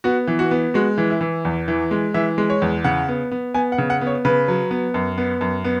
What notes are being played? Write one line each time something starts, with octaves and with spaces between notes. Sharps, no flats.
B3 F#4
E3
F#4
B3
G#3 F#4
E3
E4
E3
E2
E3
G#3
E3 E5
G#3
C#5
E2
C#3 F#5
B3
B3
B3 G#5
F#5
C#3
F#5
B3
C#5
C#3 B4
F#3
B3
F#2
B3
F#2
B3